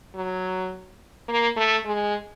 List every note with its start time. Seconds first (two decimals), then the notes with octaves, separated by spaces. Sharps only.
0.15 F#3
1.28 A#3
1.56 A3
1.85 G#3